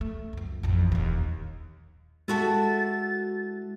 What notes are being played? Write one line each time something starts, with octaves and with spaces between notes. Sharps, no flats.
A3
C#2 F#2
A1 F2
D#1 D#2
G#3 E4 F#4 A4 A6